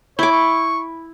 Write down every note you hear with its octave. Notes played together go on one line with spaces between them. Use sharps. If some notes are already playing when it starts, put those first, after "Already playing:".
E4 C#5 D6
C#6